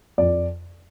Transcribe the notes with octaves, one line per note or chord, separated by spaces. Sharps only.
F2 D5